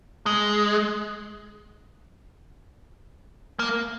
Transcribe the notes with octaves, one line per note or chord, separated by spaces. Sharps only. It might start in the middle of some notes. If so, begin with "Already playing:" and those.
G#3
A#3